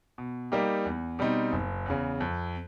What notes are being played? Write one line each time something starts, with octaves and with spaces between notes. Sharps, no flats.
B2
G3 A#3 D#4 G4
E2
B2 G3 C4 D#4
F#1
E2 C#3
F2